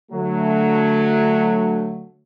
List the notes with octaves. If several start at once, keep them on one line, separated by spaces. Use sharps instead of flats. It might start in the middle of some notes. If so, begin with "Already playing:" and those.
D3 F#3 A3